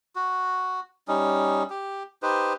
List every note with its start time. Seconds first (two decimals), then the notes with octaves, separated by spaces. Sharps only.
0.16 F#4
1.08 G3 C#4 D#4
1.70 G4
2.22 D#4 G4 B4 C5